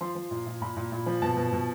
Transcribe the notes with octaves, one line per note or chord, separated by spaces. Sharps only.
F3 C6
F3
A#2
A#2
A#2 B5
A#2
A#2
F3
B2 A5
B2
B2